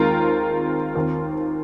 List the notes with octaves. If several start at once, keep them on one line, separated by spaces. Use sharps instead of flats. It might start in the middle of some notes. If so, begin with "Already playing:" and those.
Already playing: D#2 D#3 G#3 C4 F4 A#4
D#2 D#3 C4